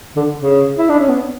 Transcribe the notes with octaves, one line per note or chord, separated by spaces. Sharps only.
D3
C#3
E4
D4
C#4
B3